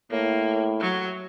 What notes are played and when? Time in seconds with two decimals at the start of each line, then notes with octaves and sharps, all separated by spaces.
0.11 A2 A#3
0.81 F#3